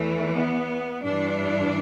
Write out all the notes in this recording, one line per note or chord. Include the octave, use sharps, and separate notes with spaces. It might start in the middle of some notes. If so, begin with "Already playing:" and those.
Already playing: E2 E3 A3
B3
G2 E3 D4